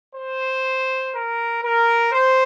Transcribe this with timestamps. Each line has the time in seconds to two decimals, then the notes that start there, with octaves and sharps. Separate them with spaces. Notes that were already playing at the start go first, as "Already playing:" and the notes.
0.14 C5
1.13 A#4
1.63 A#4
2.12 C5